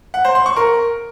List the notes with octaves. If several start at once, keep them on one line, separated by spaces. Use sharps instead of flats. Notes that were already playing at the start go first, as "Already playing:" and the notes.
F#5
C5
C6
C#6
A#4